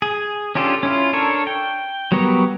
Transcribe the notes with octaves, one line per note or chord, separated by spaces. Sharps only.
G#4
C#4 D4 F4 G4 A4
C#4 E4 F4
D4 A4 A#4 C#5
G5
F#3 G3 B3 A#4 C#5